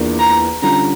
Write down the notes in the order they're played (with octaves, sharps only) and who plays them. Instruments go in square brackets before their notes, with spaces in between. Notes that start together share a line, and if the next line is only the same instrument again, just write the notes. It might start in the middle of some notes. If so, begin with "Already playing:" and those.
Already playing: [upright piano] E2 E3 A#3 D4 F4
[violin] A#5
[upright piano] D3 G3 C#4 F4 [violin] A#5